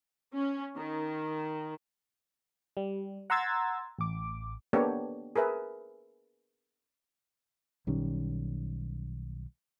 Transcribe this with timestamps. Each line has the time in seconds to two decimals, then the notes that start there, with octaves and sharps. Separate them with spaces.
0.37 C#4
0.75 D#3
2.77 G3
3.30 F#5 A#5 C6 E6 G#6 A6
3.99 A1 D6
4.73 A#3 B3 D4 G4 A4 C#5
5.36 G#4 A#4 B4 E5
7.87 B1 D#3 G3 C#4